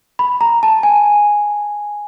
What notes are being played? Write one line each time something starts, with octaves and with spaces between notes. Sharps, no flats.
B5
A#5
A5
G#5